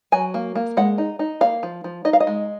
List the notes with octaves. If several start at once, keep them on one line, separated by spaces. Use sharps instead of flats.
F#3 G#5
A#3
A#3
G#3 F#5
D#4
D#4
A#3 F5
F3
F3
D#4 D#5
F5
D#5
G#3